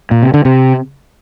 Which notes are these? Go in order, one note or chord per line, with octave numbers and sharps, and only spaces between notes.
A#2
C3
D3
C3